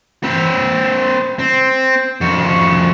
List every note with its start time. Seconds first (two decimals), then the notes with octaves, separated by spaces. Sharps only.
0.23 C4 B4
1.39 C4
2.21 F2 F#4